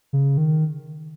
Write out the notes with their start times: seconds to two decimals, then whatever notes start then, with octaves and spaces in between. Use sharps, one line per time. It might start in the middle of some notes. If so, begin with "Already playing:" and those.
0.13 C#3
0.38 D#3